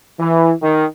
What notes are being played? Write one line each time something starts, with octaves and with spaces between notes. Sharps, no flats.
E3
D#3